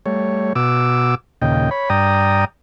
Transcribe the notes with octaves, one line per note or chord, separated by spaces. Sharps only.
G3 A3 C#5
B2 F#4 D6 E6
D#2 A#2 C#3 D#5 G5
C#5 B5
G2 D5 G5 A#5 D#6